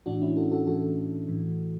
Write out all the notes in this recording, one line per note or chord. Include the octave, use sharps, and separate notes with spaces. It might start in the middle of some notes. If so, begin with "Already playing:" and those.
A2 E3 D4 F#4
C#4 E4
F#4 A4
F#4 A4
A2 E3 F#4 A4
A2 E3